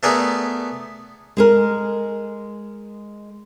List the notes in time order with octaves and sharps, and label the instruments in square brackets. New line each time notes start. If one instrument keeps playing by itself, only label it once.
[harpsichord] A3 B3 G#4 A#4 D5
[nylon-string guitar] G#3 G#4 A#4